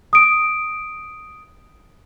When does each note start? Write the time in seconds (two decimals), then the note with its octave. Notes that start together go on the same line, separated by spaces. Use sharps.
0.13 D#6 D7